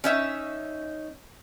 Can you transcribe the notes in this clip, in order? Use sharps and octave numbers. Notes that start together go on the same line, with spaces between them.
C#4 D#4 E5